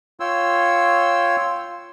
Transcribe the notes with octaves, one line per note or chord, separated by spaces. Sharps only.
F4 C#5 G5 C6 E6